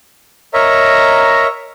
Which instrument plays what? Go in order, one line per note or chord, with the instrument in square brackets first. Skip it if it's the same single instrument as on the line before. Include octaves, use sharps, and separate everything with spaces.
[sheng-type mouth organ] A#4 C#5 D#5 E5 A#5